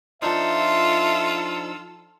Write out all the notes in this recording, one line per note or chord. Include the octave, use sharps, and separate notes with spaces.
F3 D4 D#4 F4 A4 E5 E6